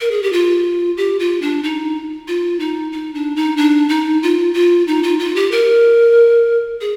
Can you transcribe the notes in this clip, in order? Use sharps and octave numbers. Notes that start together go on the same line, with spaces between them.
A#4
G#4
G4
F4
G4
F4
D4
D#4
F4
D#4
D#4
D4
D#4
D4
D#4
F4
F4
D#4
F4
F4
G4
A#4
G#4